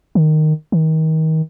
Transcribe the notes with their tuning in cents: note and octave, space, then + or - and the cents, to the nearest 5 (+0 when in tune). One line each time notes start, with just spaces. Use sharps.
D#3 -10
D#3 +30